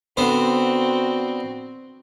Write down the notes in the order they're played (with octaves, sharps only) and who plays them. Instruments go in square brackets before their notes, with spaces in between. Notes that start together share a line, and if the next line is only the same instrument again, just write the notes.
[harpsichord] D3 B3 C5 [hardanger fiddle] C4 F#4